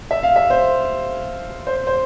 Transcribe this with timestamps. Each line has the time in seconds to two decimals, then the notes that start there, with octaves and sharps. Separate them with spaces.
0.11 E5
0.23 F5
0.36 E5
0.50 C5
1.67 C5
1.87 C5